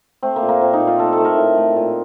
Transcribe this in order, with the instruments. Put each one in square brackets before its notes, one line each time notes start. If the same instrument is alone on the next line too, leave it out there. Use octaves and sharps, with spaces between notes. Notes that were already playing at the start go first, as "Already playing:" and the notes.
[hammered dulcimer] A3 C4
A#3
A#2
A#3
A#2 C4
D#4
A#2
F4
A3 A4
A4
A3
A#4
A2
A3
A#2